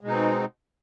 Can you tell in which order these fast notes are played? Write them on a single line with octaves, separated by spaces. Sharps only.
G#3 B2 D#4 C4